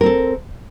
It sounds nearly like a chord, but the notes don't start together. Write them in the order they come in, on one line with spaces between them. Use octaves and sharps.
A#4 C4 A4